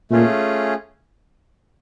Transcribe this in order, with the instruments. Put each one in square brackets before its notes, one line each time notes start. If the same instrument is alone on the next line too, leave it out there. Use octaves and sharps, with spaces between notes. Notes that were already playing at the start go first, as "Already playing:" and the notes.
[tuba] A#2 [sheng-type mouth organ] A3 C#4 F4 G#4